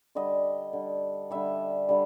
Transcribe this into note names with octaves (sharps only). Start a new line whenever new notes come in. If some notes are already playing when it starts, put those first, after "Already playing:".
D3 G3 D#5
D3 G3
D3 G3 E5
D3 G3